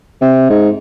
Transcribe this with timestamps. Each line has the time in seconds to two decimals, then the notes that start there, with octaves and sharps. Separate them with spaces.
0.21 C3
0.50 G#2